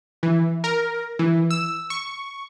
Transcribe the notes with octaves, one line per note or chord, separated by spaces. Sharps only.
E3
A#4
E3
E6
C#6